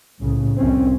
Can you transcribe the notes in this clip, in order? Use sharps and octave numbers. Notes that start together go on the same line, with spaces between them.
C2 A2 C#3
C2 F2 C4 C#4